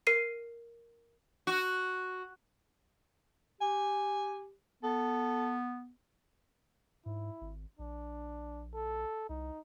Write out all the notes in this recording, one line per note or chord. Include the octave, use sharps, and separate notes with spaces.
A#4 C7 D#7
F#4
G4 G#5
B3 A4
G#2 E4
G#1
A#1 D4
A4
C2 D#4